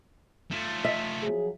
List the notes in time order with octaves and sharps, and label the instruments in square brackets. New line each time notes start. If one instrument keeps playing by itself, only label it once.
[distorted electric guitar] A3 F4
[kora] E5
[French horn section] F3 F#3 G#4